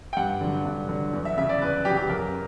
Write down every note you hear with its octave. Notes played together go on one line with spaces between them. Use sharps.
G5
G2 F#5
D3 F#3
G2
D3 F#3
E2
E5
C#3 F#3 E5
D5
E2 B4
C#3 F#3 G4
G4
F#2 A#4